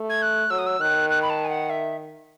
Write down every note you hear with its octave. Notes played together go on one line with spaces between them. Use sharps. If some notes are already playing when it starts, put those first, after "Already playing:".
Already playing: A3
G#6
F#6
F#3 E6
D#6
E6
D#3 F#6
F#6
B5
A5
G#5
F#5
E5